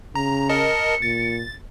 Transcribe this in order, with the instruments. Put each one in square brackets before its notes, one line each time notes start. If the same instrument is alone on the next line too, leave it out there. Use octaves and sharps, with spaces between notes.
[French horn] C#3 [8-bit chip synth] A#5
[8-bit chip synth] A#4 D#5 A5 [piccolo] C#7
[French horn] A#2 [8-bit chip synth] A6